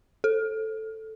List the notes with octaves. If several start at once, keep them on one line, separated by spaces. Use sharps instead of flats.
A4